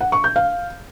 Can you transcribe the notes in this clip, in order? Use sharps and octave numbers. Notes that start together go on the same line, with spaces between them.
F#5
C#6
G6
F5